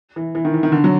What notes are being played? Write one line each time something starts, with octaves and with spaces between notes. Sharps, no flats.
E3
E3
D#3
E3
D#3
D3
F#3